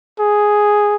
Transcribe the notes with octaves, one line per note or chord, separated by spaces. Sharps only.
G#4